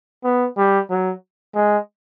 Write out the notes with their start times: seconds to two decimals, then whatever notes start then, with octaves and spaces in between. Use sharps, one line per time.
0.24 B3
0.57 G3
0.90 F#3
1.54 G#3